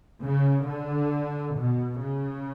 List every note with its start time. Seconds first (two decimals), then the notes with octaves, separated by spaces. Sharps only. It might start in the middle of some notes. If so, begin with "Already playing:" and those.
0.23 C#3
0.68 D3
1.58 B2
2.03 C#3